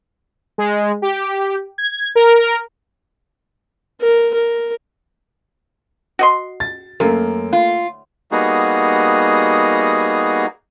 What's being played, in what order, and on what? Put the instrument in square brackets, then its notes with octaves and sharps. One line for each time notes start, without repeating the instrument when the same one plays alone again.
[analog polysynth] G#3
G4
G#6
A#4
[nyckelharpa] A#4
A#4
[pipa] F#4 D#5 C6
[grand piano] A6
[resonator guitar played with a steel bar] F#2 [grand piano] A3 A#3
[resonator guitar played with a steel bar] F4
[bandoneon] G3 A#3 B3 D#4 F#4 G#4